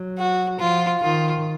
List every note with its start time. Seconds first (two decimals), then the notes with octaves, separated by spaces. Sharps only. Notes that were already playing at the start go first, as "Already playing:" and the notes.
Already playing: F#3
0.18 F#4
0.59 F3 F4
1.01 D#3 F4